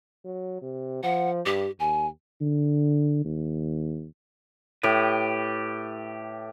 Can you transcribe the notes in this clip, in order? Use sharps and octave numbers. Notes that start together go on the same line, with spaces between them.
F#3
C3
F3 F#5
G2 G4
D#2 G#5
D3
D#2
A2 G4 B4